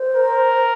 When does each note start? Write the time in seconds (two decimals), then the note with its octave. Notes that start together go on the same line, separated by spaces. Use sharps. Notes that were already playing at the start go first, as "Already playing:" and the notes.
Already playing: C5
0.16 A#4